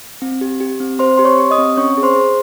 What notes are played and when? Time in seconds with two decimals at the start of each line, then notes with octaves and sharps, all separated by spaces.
0.22 C4
0.41 G4
0.61 G4
0.80 C4
0.99 C4 C5 C6
1.18 G4 C6
1.25 C#5 C#6
1.38 G4
1.51 D#5 D#6
1.58 C4
1.77 C#4 C#5 C#6
1.97 G#4
2.03 C5 C6
2.16 G#4